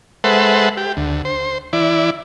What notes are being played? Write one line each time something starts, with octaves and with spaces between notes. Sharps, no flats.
G#3 A4 B4 C5 E5 F#5
G4
D2
C5
E3 E4 D5